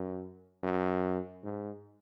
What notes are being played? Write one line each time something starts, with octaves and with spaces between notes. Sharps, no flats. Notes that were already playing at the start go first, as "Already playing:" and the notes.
Already playing: F#2
F#2
G#2